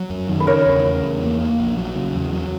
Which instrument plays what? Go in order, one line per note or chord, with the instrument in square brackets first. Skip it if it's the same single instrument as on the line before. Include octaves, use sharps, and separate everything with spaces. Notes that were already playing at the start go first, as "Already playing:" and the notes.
Already playing: [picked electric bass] F#3
F#2
D#3
[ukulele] B4
[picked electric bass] C#3 [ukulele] A#4 C#5
[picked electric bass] E2
C#3
E2
A#3
A#3
A#1
F#3
C#3
E2
F#3